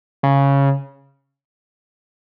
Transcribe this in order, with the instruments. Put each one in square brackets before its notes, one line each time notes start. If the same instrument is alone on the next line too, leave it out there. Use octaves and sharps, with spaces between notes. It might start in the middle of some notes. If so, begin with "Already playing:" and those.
[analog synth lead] C#3